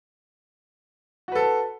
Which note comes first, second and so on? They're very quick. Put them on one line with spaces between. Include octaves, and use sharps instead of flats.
F#4 B4 A4